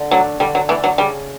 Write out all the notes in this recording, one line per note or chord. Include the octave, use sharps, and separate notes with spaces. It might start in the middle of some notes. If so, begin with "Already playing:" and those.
Already playing: D3
F#3 A3 D4
D3 G3
F#3
E3 A3 D4
F#3
C#3 G3